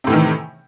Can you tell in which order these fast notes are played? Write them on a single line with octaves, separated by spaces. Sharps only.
C3 A2 E3 D#3